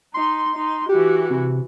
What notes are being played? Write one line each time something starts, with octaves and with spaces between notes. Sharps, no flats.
D#4 C6
D#4
E3 F#4 G4
C3